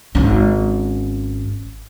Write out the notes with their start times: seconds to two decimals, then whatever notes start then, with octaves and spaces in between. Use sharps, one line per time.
0.15 G#1 C#4